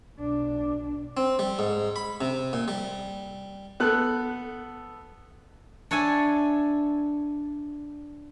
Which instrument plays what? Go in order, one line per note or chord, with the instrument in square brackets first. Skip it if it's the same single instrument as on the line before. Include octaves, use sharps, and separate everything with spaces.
[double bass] B1 D4
[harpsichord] C4
G3
G#2
B5
C3
A#2
G3
[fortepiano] B3 A4 F#6
[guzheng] D4 C#5 E5 G#5 A5